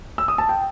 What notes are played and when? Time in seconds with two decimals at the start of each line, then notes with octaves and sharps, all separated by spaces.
0.18 E6
0.28 D#6
0.38 A5
0.49 G5